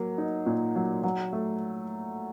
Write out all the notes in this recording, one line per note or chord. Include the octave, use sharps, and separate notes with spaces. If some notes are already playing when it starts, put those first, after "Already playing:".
Already playing: F#3 A#3
D#4
A#2
F#3
F#3
A3